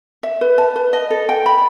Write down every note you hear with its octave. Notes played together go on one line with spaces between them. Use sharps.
E5
B4
A5
B4
D#5
A4
G5
B5